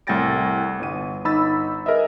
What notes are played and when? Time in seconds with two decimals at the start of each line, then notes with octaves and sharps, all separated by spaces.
0.07 C2 A2 G5 A6 A#6 D7
0.79 G1 D#7
1.25 G1 D#4 B5 E6 A6
1.86 G#4 A#4 B4 D#5 E5